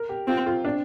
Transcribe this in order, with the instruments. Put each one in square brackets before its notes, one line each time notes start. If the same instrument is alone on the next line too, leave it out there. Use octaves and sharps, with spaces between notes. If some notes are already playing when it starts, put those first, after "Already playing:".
Already playing: [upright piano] A#4
G4
[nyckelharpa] C4 [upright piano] F4
[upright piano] F4
D4